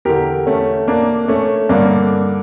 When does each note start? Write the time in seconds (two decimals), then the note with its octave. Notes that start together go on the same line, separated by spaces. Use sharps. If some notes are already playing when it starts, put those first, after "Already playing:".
0.05 E2 D3 G4 A#4
0.47 A3 C#4
0.88 A#3 D4
1.28 A3 C#4
1.69 G2 D3 A#3 D4